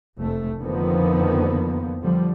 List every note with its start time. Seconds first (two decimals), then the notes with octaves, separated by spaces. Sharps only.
0.18 F1 A3
0.61 F2 D3 D#3 F3 A#3 B3
2.03 D3 F3 G3